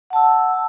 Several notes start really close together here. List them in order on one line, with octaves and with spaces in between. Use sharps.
F#5 A5 E6